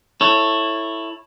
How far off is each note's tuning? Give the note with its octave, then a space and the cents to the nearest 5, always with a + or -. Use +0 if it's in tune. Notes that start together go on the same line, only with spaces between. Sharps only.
E4 +0 A4 +10 C#5 -10